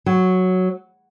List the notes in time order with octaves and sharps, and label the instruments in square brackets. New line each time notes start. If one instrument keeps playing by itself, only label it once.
[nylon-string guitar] F#3